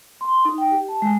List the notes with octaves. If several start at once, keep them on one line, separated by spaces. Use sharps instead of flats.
C6
D#4
G5
G4
A5
G#3